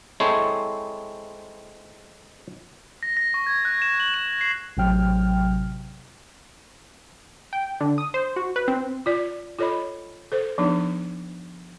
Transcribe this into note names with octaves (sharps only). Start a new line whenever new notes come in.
G#3 C4 E4 A4 C5 C#5
A#6
A#6
C#6
G#6
F#6
E7
F#7
E7
C7
A1 C3 F#3 G5 F6
G5
D3
D#6
C5
F#4
B4
C4
F4 D5
F4 A4 C#5 D#5 B5
A4 C5
F3 B3 D4 D#4